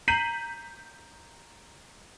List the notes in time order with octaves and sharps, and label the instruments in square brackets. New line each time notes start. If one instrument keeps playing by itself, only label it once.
[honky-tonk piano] A#5 G6 B6 C7 D#7 F#7